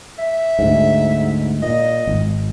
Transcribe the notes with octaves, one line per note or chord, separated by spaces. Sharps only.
E5
D2 G#2
A#2 D#5
G#1